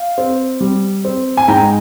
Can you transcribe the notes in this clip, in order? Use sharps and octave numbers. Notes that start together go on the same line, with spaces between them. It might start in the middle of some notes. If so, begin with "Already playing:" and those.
Already playing: F5
C4
G3
C4
G#5
G#2 G5 A#5